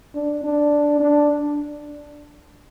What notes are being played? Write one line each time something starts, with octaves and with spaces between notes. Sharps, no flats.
D4
D4
D4